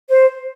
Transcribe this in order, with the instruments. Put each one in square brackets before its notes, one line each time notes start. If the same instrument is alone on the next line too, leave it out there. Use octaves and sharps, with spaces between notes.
[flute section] C5